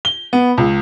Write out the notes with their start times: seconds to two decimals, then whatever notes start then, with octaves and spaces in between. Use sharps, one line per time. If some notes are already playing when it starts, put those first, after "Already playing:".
0.05 G7
0.33 B3
0.58 C#2